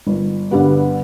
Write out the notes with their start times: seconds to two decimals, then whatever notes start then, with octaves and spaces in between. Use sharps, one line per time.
0.07 G1
0.51 G2 D3 G3 B3